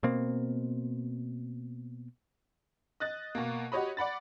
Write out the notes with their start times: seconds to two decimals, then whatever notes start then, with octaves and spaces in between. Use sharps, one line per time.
0.03 B2 A#3 C4
3.00 D#5 F#6 A6
3.35 B2 A#3
3.72 F#4 G4 C#5 D#5 B5
3.97 D5 F#5 B5 A6